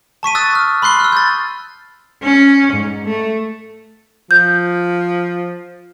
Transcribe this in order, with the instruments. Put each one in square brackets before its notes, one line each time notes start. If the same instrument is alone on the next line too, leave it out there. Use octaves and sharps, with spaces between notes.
[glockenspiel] A5 C#6 B6 D#7
D#6 E6 F#6 A6
F6
B5 C6 F#6 C7 G7
E6 F6
G6 A6
[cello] C#4
G#2
A3
[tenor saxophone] F3 [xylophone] G6